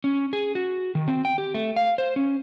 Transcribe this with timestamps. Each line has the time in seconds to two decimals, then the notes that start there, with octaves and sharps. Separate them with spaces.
0.04 C#4
0.33 G#4
0.55 F#4
0.95 D#3
1.08 C4
1.25 G5
1.38 G4
1.54 A3
1.76 F5
1.98 C5
2.16 C#4